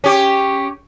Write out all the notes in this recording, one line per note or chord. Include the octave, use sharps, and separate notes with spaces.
C#4 G4